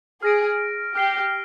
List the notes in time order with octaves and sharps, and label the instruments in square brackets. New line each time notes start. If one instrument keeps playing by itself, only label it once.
[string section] G#4 [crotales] F6 A#6 D7
[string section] G4 [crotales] F6 C7 G7